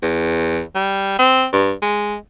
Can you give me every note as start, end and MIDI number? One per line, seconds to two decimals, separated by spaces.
0.02 0.62 40
0.75 1.14 55
1.19 1.46 60
1.53 1.73 43
1.82 2.16 56